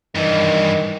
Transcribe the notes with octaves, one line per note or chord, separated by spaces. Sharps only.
G2 D#3 E3